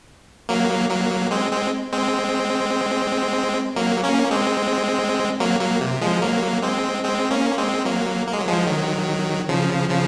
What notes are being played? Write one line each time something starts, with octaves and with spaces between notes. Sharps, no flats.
F#3 A#3
F#3 A#3
G#3 C4
G#3 C4
G#3 C4
F#3 A#3
A#3 C#4
G#3 C4
F#3 A#3
F#3 A#3
C3
F3 G#3
F#3 A#3
G#3 C4
G#3 C4
A#3 C#4
G#3 C4
F#3 A#3
A#3
G#3
F#3
F3 G#3
D#3 F#3
C#3 F3
C#3 F3